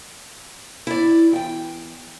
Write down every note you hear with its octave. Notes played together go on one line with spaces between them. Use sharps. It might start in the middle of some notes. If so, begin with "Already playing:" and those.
E4 D5
E2 G5